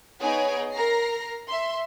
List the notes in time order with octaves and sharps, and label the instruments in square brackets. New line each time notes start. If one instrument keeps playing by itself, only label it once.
[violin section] B3 D#4 G#4 C#5 G#5 D7
A#4 A#5 A#6 C7
E5 C6